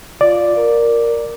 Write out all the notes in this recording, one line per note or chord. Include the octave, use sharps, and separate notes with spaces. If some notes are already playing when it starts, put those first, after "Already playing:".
F4 D5
A#4